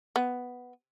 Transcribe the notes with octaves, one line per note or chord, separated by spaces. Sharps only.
B3